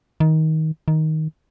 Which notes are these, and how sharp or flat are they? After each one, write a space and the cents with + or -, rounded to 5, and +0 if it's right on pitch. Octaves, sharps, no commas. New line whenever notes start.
D#3 +20
D#3 +10